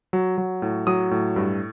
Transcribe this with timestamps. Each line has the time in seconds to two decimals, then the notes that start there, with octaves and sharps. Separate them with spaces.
0.13 F#3
0.38 F#3
0.62 A2
0.87 F#3 D#6
1.11 A2
1.36 G2